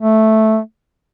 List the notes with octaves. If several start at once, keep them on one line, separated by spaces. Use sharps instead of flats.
A3